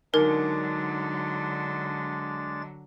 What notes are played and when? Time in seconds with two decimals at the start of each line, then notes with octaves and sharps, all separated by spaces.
0.14 D3 F#3 G#3 D4 D#4 A#4 A6